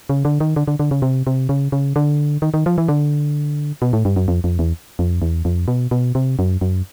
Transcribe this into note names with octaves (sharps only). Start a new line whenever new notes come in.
C#3
D3
D#3
D3
D3
D3
C#3
C3
C3
C#3
C#3
D3
D#3
D#3
F3
E3
D3
B2
A2
G2
F#2
F2
F2
E2
F2
E2
F2
B2
B2
C3
F#2
F#2